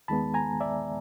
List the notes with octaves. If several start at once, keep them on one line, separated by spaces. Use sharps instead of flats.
D#2 D#3 G#3 B3 A5 B5
G#5 A#5
D5 E5